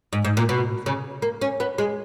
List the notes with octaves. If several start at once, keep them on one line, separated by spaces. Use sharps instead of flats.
G#2
G#2
A#2
B2
C#3
A#3
C#4
B3
G#3